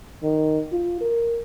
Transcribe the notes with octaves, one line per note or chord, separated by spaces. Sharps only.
D#3
F4
A#4